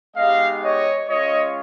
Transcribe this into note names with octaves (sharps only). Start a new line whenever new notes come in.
G#3 B3 D#4 G4 D#5 F5
C#5 D#5
G#3 C#4 F4 C#5 D#5